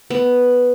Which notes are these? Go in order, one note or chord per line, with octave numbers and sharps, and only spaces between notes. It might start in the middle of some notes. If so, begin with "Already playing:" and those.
B3